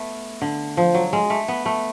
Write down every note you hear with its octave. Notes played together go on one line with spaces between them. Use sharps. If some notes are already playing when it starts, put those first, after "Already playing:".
Already playing: A3 B3
D3
F3
F#3
G#3
A3
B3
A3